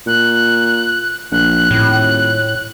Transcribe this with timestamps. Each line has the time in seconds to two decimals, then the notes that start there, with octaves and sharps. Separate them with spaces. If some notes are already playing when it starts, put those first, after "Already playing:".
0.07 A#2 F#6
1.31 A#1 F#6
1.71 D#1 A2